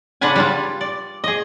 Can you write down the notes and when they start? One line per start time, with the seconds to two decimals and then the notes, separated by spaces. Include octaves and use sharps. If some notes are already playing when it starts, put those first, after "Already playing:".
0.21 C#3 D4 F4 B4 F#5 G#5
0.36 G3 D4 F4
0.81 D5
1.24 G#4 D#5